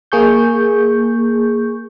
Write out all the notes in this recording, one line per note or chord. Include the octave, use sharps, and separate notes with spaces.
A#3 G#4 C#6 G6